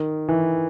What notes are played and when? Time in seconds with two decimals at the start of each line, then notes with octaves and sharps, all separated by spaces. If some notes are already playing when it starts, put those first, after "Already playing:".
Already playing: D#3
0.28 E3